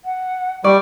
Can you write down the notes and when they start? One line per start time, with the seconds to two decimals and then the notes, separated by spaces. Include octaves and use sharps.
0.05 F#5
0.64 G3 D5 C#6